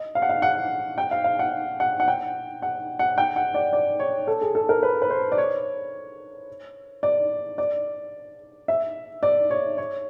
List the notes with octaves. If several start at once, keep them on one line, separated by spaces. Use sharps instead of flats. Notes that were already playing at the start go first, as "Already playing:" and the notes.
Already playing: D#5
F5
F#5
F5
F#5
G5
F5
F5
F#5
F#5
F#5
G5
F#5
F#5
G5
F#5
D5
D5
C#5
A4
G#4
A4
A#4
B4
B4
C5
D5
C#5
D5
D5
E5
D5
C#5
C#5